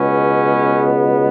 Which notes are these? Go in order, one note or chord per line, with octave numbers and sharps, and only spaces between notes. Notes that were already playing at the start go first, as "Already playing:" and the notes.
Already playing: C#2 B2 G#3 B3 C#4